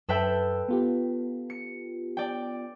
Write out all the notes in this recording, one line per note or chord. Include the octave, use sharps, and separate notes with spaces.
F#2 A4 B4 E5 G5 E6
B3 F4 G4
C#7
D5 G5